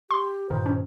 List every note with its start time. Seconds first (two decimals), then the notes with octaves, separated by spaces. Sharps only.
0.11 G4 C6
0.50 G2 A#2 D#3 C5
0.66 C#4